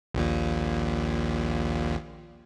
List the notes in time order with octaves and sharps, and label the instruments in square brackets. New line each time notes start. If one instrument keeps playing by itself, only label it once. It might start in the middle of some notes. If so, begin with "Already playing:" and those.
[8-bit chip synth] A#1 D#2 A#2